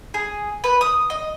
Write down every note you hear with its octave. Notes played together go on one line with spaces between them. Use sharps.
G#4
B4
D#6
D#5